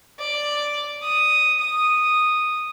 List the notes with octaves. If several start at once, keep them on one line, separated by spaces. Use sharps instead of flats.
D5
D#6
D#6